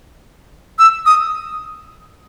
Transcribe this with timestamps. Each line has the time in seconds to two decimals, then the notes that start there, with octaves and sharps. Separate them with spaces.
0.79 E6
1.06 D#6